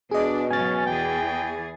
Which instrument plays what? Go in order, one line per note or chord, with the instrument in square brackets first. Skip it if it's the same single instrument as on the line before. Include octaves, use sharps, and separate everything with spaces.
[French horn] B2 [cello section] D4 D5 [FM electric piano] G#4 D#5
[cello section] G#2 C#3 F#3 [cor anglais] C#4 [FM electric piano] G#5 A6
[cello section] E2 E3 G#4 [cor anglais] G5